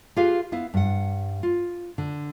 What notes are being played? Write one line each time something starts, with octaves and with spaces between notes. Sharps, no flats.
F4 G4 G#4 B4 F5
B3 E4 F5
G2 F#5
F4
D3